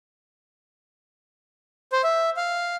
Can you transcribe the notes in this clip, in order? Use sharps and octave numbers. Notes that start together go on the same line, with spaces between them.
C5
E5
F5